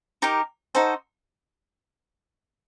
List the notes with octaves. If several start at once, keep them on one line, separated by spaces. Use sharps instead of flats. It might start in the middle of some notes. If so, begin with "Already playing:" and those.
D#4 G4 A#4
D#4 F#4 A4 C5